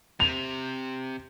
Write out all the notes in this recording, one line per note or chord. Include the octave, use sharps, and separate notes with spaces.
C3 F7